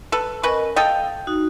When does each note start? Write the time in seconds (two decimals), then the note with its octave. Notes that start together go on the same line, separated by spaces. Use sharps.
0.12 A4 B4
0.43 C#4 A#4 B4 D#5
0.76 A4 D#5 F5 G5
1.27 D#4 F#4